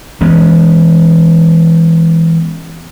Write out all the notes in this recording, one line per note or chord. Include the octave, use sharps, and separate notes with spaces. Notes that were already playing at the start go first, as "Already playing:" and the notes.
E3 G#3 B3 C#4